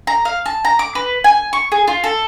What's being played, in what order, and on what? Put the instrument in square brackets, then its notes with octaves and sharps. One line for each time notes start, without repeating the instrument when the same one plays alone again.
[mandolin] A#5
F5
A5
A#5
D6
B4
G#5
C#6
G#4
F4
A4